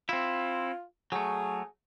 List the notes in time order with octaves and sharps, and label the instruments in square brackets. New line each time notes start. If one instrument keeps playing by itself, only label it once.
[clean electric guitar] C4 E4 [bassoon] F4
[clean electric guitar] F#3 A3 [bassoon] G#4